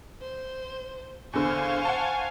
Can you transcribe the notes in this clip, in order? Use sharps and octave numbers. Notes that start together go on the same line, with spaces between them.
C5
E2 D3 C5 F5 G#5 C#6
F#5 A5